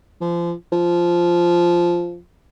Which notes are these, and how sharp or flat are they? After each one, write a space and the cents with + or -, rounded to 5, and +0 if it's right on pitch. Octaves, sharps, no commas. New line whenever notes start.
F3 -30
F3 -5